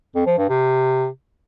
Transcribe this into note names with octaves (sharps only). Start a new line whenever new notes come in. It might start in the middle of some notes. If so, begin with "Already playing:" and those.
F2
F3
G2
C3